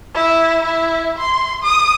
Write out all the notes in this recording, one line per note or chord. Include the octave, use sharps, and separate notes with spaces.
E4
E4
C6
D#6